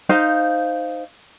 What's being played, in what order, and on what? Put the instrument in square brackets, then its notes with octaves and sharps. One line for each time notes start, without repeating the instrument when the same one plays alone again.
[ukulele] D#4 C5 F5